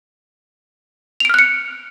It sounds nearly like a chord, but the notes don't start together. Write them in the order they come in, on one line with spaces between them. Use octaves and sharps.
F7 D7 F6 F#6 C#7